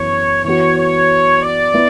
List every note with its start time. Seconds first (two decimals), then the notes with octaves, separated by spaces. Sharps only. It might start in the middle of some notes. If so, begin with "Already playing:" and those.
Already playing: F#2 E3 B3 C#5
0.44 E3 B3 F#4 C#5
0.77 C#5
1.42 D5
1.74 B3 E4